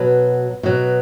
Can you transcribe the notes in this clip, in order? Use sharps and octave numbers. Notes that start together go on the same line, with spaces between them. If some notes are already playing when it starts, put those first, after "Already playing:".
Already playing: B2 F#3 B4
B2 F#3